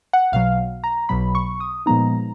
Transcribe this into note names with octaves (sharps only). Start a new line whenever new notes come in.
F#5
B1 B2 F#3 F5
A#5
B1 B2 F#3 B5
C#6
D#6
A#2 F3 G#3 B3 D#4 A#5